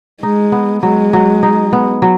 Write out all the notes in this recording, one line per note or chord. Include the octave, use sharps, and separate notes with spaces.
G#3 D#4
B3
F#3 G#3
F#3
D#4
B3
F#3